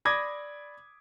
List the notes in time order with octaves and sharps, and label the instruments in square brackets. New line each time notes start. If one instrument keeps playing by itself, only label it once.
[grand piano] D5 B5 D6 D#6 G#6 A#6